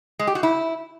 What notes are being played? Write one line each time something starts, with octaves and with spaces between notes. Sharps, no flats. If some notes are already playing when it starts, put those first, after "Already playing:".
G#3
G4
F#4
E4